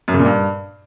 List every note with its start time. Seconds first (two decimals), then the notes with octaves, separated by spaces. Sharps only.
0.08 F#2
0.14 C#3
0.19 A#2
0.25 G2